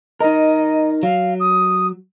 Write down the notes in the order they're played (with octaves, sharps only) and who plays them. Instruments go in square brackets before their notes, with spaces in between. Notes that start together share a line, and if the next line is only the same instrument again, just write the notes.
[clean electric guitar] D#4 A#4 [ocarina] D#5
[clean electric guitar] F#3 [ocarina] F5
[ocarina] D#6